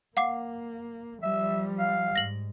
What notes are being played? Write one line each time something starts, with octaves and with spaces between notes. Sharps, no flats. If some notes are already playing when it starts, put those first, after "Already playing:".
A#3 F5 F#5 D6
F3 G3 E5
F5
G#2 A#6 F#7